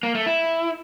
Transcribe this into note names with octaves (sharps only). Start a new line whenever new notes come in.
A#3
A3
E4